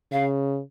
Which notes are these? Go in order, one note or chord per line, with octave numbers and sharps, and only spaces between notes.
C#3 F5